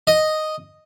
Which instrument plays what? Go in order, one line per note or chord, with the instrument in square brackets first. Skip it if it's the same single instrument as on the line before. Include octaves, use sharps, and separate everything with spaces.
[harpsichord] D#5